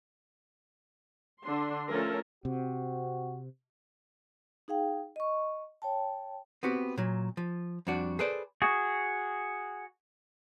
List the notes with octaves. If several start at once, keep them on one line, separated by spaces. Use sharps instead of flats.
D3 D4 C6
F3 A3 C#4 F4 A4 A#4
C3 C4 F#4
D#4 G#4 F5 G5
D#5 C#6
C#5 G5 A5
B3 C4 F#4 G4
A#2 F#3
F3
F2 G3 D4 F#4
G#4 A4 B4 C5 D5
F#4 G#4